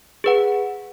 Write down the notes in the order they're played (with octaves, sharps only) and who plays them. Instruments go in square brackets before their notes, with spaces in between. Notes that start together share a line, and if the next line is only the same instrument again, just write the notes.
[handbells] G#4 B4 F#5